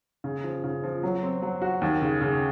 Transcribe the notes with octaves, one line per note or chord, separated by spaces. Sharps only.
C#3
F3
C#3
F3
F#3
C4
F#3
F#4
D#2
C#3
C#3